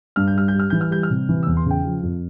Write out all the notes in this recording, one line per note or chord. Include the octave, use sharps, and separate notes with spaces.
G2 F6
G6
G3 F6
G6
G3
F6
E3 G6
F6
G3 G6
F6
C3
E3
E6
E2
C6
C#3 G5
F3
F2